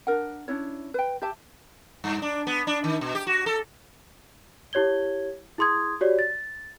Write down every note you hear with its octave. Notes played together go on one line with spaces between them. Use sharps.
D4 A#4 F#5
C#4 D4 E4 C#5
B4 G5
G4 E5 A5
G2
D4
B3
D4
D#3
B2
G4
F#4
A4
E4 G4 C#5 G#6 G7
E4 G#4 C6 D#6 G#6
F#4 G4 C#5 D5
A6